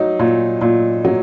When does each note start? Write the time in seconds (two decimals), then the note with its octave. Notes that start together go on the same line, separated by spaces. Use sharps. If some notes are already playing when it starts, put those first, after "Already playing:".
Already playing: F#3 D#4
0.19 A#2
0.61 A#2
1.05 F#3